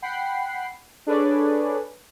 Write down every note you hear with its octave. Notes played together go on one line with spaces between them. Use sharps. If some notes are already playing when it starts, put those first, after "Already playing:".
F#5 G5 B5 C7
D4 G#4 A4 B4 C#5 D5